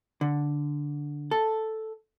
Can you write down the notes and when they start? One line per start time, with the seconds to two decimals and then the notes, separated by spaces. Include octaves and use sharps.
0.21 D3
1.31 A4